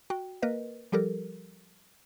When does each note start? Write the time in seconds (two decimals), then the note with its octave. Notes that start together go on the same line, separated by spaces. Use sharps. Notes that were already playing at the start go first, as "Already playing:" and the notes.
0.10 F#4 G5
0.42 A#3 A#4 B4 D#5
0.92 F3 G3 G4 A4 A#4